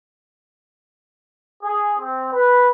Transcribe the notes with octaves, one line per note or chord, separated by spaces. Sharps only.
G#4
C4
B4